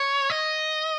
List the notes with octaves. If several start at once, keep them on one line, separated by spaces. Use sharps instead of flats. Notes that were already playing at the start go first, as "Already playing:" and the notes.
Already playing: C#5
D#5